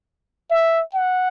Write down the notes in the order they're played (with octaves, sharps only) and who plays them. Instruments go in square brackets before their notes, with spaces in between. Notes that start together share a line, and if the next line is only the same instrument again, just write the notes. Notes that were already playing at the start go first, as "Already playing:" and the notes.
[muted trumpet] E5
F#5